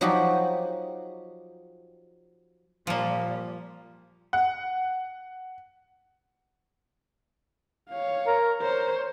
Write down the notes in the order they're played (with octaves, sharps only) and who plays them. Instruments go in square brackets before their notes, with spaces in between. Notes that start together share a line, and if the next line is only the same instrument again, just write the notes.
[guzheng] F3 F#3 D#4 F#4 G4
[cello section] A#2 G3 [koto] F3 A#3
[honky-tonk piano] F#5
[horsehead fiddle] C#5 F5
[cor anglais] A#4
[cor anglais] A#4 [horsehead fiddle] C5 C#5